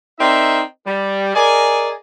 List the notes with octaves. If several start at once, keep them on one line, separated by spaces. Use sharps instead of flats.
C4 D#4 A#4 D5 E5
G3
G#4 A#4 D5 D#5 G#5